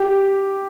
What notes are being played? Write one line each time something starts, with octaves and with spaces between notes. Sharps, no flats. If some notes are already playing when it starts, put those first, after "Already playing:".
Already playing: G4